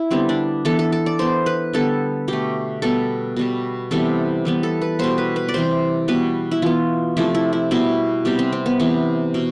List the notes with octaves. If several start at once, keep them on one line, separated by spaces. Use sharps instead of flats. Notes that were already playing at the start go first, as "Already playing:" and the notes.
Already playing: E4
D3 G3 B3 C4
D4
E3 B3 A4
A4
A4
D5
E3 B3 C5
B4
D3 G3 B3 A4
B2 A3 G4
B2 G3 B3 A4
B2 G3 B3
C3 E3 G3 B3 A4
E3 G3 B3
A4
B4
B2 G3 B3 C5
B4
B4
D5
C3 E3 G3 C5
B2 G3 B3 B4
E4
E3 B3 F4
C3 F3 A3 E4
E4
E4
B2 G3 B3 E4
C3 G3 B3 G4
C4
C4
B3
C3 E3 B3
B2